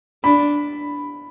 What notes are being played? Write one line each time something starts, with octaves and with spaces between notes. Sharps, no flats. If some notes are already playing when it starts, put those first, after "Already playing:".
D4 B5